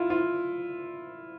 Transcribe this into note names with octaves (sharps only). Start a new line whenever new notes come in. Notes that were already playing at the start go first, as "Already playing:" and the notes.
Already playing: E4 F4
F4